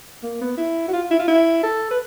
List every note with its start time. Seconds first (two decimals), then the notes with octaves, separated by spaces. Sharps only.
0.23 A#3
0.41 B3
0.57 E4
0.88 F#4
0.93 F4
1.11 E4
1.19 F4
1.28 E4
1.63 A4
1.91 B4